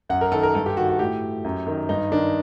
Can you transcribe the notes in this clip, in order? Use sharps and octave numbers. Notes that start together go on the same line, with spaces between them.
F#2 F#5
A#4
D#3 A4
A#4
G2 A4
G4
D#3 F#4
F#4
A2 G4
F#2
D#3
G2 D#4
D#3 D4